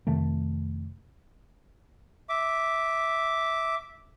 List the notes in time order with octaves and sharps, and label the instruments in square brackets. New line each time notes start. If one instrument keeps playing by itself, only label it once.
[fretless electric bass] F2 C3 D#3 A3
[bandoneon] E5 D6